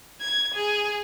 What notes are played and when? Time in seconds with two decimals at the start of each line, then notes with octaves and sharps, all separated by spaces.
0.21 G#6
0.54 G#4